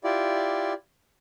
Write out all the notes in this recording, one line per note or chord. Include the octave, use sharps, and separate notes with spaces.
E4 F4 G4 D5